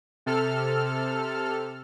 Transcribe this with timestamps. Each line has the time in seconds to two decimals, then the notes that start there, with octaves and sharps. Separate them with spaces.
0.26 C3 A4 F6